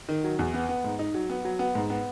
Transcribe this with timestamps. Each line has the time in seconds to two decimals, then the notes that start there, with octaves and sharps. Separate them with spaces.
0.09 D#3
0.24 F#3
0.39 E2
0.54 B3
0.69 B3
0.84 G#2
0.99 D#4
1.14 F#3
1.30 B3
1.45 F#3
1.59 B3
1.75 G#2
1.90 B3